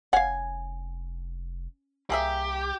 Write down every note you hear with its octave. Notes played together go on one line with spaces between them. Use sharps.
F1 C#4 F5 F#5 G#5
C2 A#3 G4 G#4 E5